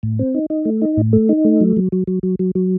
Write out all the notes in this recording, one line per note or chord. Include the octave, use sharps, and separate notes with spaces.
A2
C4
D#4
D#4
A3
D#4
A2
A3
D#4
A3
F#3
F#3
F#3
F#3
F#3
F#3
F#3